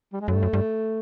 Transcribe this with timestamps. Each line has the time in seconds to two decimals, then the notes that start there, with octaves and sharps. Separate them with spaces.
0.13 G3
0.21 G#3
0.28 F#2 A3
0.35 G2
0.43 F#2
0.53 G2